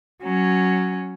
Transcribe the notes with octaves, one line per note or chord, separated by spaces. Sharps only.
F#3 C#4